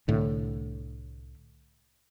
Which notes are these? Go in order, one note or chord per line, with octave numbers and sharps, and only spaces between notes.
C2 A2 D3